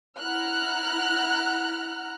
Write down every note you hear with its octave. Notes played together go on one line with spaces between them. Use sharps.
E4 F#5 A#5 F6 F#6